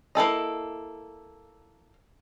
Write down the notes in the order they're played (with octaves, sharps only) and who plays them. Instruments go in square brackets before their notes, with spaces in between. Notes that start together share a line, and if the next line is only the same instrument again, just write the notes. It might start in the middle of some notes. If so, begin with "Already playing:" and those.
[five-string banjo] A#3 E4 A4 D#5